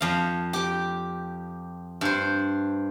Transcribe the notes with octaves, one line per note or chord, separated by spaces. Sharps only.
F2 F5
G4 G5
G2 C5